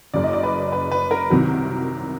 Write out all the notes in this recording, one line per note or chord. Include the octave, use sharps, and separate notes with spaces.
F#1 F#2 C#3 D5
D#5
D5
B4
B4
B4
A#4
C2 C3 D#3 F#3